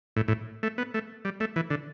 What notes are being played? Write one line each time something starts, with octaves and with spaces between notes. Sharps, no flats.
A2
A2
A3
B3
A3
G3
A3
E3
D3